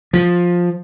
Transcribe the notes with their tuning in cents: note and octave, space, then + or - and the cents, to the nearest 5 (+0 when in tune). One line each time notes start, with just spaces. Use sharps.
F3 +10